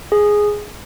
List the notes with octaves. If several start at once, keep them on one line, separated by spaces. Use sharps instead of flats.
G#4